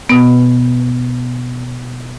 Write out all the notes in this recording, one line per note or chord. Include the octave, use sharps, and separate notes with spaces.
B2 B3